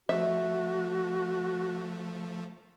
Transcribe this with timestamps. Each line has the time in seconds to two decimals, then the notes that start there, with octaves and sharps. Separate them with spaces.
0.09 F3 A3 F#4 E5